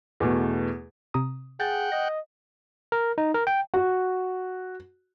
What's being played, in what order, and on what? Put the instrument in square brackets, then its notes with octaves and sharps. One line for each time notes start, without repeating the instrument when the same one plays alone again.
[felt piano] E2 B2 A3
[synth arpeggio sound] C3 A#5 D#6
[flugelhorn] G#4 [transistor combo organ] F#5 G5 [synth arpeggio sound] G6 A6
[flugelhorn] D#5 [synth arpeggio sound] A#6
[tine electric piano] A#4
D#4
A#4
G5
[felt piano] F#4